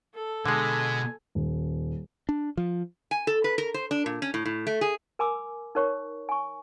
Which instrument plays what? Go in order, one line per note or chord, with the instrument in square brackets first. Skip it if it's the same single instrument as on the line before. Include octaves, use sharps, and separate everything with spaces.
[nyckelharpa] A4
[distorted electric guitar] B2 [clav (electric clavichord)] D3 G#3 [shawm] G#5
[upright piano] D#1
[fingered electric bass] D4
F3
[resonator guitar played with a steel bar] G#5
A4
B4
A#4
C5
D4
A#2
C#4
A2
A2
A3
G#4
[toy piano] A#4 G#5 B5 D6 E6
D#4 A#4 C#5 C#6
G#5 C#6